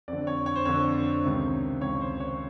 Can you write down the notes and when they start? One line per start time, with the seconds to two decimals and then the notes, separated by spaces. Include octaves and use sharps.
0.08 F2 D3 D5
0.27 C#5
0.46 C#5
0.56 C5
0.65 F2 D3 C#5
1.23 C#2 C3 D#3
1.81 C#2 C3 D#3 C#5
2.01 C5
2.20 C#5